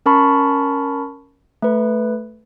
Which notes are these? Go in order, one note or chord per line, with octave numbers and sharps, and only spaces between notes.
C#4 A#4 A5 B5 C#6
A3 B4